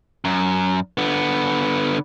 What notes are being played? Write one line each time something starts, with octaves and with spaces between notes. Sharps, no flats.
F#2
D3 B3